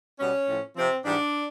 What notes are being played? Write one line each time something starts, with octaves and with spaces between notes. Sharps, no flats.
B2 G3 C#4
A2 F3
C3 F3 C4
G#2 E3 G3 D4